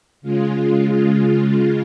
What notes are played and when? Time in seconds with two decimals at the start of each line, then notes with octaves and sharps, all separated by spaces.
0.22 C#3 G#3 F4